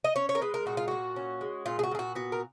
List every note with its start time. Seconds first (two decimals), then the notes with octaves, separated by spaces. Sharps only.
0.04 D#5
0.16 C#4 C#5
0.29 C#5
0.35 A#4
0.42 G#3 B4
0.54 A#4
0.66 A#2 F#4
0.77 F4
0.88 A#2 F#4
1.16 C#4
1.41 G#3
1.66 A#2 F4
1.79 G#4
1.83 F#4
1.91 A#2 G#4
1.99 F#4
2.15 B3 F#4
2.32 A#4